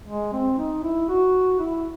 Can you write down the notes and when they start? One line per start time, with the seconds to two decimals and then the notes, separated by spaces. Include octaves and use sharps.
0.08 G#3
0.33 C4
0.58 D#4
0.84 E4
1.09 F#4
1.59 E4